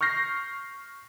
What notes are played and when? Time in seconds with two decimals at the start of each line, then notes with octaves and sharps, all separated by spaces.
0.01 C#6 F6 G6 A#6 C7